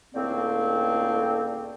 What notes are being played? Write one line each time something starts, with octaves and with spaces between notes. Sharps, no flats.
C#2 A2 D3 A#3 C4